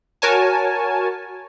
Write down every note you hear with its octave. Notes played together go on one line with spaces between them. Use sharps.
F#4 A#4 C#5 G#5 A5